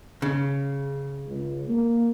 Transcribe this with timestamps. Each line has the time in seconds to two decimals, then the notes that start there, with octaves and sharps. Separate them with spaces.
0.22 C#3
1.27 C#2
1.68 A#3